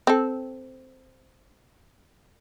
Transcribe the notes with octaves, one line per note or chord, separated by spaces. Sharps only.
C4 A4